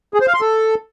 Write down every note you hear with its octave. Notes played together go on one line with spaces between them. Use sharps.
G#4
C5
F5
C6
A4